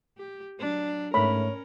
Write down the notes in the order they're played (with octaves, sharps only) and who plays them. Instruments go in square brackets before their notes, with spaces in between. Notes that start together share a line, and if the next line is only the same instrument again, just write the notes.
[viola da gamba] G4
F#3 D4
[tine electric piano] G#2 A3 [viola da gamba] C#4 A#4 [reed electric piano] C#5 [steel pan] B5